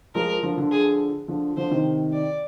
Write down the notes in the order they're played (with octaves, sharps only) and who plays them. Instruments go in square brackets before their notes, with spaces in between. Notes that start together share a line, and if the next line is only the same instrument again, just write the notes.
[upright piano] F3 G#3 [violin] A#4
[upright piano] D3 F3
D3 F3
[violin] G#4
[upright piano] D3 F3
[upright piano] D3 F3 [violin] C5
[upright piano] C3 D#3
[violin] D5